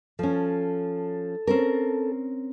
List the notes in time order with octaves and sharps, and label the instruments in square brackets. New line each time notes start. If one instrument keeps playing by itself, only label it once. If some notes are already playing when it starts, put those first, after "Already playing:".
[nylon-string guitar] F3 C#4 [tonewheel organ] A4
[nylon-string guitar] C4 C#4 A#4